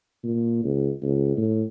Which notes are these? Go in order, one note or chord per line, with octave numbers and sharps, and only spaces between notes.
A#2
C#2
C#2
A2